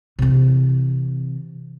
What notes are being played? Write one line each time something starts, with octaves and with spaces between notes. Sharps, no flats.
C3 E3